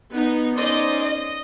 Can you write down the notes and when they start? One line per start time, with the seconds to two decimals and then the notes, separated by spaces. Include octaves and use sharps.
0.11 B3 D#4
0.54 C#4 D#4 C5 D5 D#5
1.01 D#5